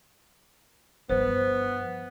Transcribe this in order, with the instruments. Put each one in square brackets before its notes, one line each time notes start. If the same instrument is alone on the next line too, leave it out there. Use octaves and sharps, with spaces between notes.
[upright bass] G2 F3 [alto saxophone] B3 [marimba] C5